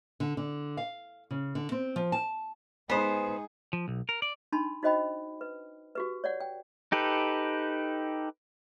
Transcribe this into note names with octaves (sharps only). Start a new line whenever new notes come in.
D3
D3
F5
C#3
D3
C4
F3
A5
G#3 B3 D#4 G#4 C5
F3
B1
A#4
D5
D4 D#4 A5 B5 C6
D#4 F#4 C5 D#5 G5 B5
B4
F#4 G4 B4
C#5 D5 F#5
G5
D#4 G4 A4 B4